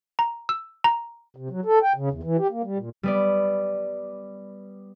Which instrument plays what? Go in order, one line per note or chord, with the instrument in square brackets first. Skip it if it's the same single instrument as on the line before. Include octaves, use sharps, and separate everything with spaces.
[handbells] A#5
E6
A#5
[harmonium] C3
F#3
A4
G5
C#3
E2
E3
G4
A#3
G3
A#2
[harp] G3 B3 D5